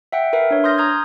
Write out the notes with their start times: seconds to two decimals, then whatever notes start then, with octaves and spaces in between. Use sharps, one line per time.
0.12 E5 F#5 G5
0.33 A#4 B4 E5
0.51 D4 C#5
0.64 C6 D#6 F6 G6 A#6
0.78 A#5 D#6 G6 G#6